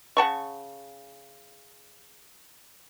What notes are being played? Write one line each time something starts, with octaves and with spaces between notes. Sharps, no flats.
C#3 F#5 A5 C#6